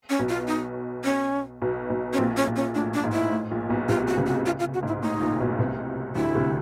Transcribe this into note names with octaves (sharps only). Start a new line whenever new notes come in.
C#4
B1 B2
F4
D#4
C#4
B1 B2
B1 B2
C#4
A#1 A#2 C4
C#4
A#1 A#2
C#4
A2 D4
D4
G#2
E4
A2
A#1 A#2
B1 B2
C2 C3 F4
F#4
C#2 C#3
F#4
F4
F4
F#4
G#2
E4
A2 D#4
A#1 A#2
B1 B2
C2 C3
D2 D3 E4
C2 C3